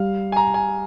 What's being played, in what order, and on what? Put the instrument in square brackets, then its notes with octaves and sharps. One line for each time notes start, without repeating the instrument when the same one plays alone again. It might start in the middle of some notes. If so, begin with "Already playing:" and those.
Already playing: [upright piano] G3 [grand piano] F5
[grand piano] G#5
A#5
G#5